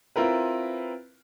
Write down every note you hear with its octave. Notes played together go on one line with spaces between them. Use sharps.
C4 E4 F4 A#4 B4